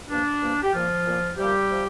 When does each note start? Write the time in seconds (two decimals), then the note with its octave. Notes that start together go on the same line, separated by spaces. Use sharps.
0.10 G2 F3 A#3 D4
0.41 G2 F3 A#3
0.63 G4
0.73 A#2 F3 A#3 F4
1.05 A#2 A#3
1.37 C3 F3 G3 A#3 G4
1.70 C3 F3